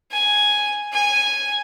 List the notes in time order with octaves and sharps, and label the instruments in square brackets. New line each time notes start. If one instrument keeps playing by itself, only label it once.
[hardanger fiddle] G#5
G#5